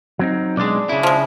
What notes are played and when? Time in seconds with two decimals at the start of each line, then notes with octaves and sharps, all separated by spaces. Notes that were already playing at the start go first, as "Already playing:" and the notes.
0.19 F#3 C4 D#4
0.57 B1 G#3 D4 D5
0.89 C#3 E4
1.03 F3 G#3